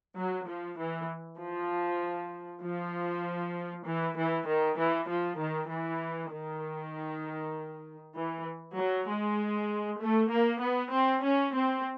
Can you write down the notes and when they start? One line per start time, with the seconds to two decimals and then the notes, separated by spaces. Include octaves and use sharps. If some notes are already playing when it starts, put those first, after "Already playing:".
0.16 F#3
0.47 F3
0.77 E3
1.38 F3
2.62 F3
3.84 E3
4.16 E3
4.47 D#3
4.78 E3
5.08 F3
5.39 D#3
5.69 E3
6.31 D#3
8.16 E3
8.76 F#3
9.08 G#3
10.01 A3
10.31 A#3
10.62 B3
10.92 C4
11.23 C#4
11.54 C4